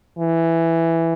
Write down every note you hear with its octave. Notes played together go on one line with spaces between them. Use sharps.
E3